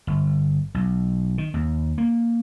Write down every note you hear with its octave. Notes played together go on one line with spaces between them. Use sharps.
G1
B1
D#3
D#2
A#3